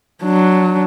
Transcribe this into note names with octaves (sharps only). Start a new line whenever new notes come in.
F#3 D4